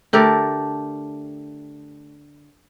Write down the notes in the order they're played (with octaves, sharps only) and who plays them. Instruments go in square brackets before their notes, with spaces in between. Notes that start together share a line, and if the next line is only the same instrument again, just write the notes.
[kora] D3 A3 G4 A#4